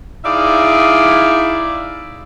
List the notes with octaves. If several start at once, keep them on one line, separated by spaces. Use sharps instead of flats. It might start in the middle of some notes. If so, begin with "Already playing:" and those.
D#4 E4 G#4 D5 E5 F5